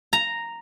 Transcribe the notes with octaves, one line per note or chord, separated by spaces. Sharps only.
A#5